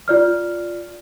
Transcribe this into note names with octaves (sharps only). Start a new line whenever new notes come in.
F4 D5 F6